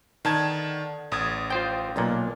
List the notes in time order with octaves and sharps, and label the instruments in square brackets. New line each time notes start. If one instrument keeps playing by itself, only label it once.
[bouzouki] D3 B3 D5 [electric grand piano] D#3 A5 G#6
[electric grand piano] A1 D#6 G#6
[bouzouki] F3 [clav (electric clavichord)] F4 C5 G5
[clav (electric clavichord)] B1 A#2 [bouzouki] D3 A#3 D4